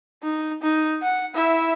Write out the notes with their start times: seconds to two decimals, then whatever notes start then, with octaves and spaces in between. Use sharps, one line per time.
0.23 D#4
0.62 D#4
1.02 F#5
1.35 E4 E5